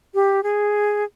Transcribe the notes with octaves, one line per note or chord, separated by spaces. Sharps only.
G4
G#4